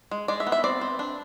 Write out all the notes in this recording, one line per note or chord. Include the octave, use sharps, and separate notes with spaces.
G#3
G#3 D5
E5
B3
E5
C4 D5
C4
D4